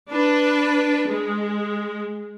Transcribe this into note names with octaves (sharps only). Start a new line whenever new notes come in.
D4 B4
G#3